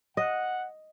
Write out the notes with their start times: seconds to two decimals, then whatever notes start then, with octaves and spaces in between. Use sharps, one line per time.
0.17 D#5 F#5